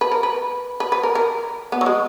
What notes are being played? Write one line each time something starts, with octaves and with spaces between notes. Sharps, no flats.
B4
A#4
B4
B4
B4
A#4
A#4
B3
F#3
G#3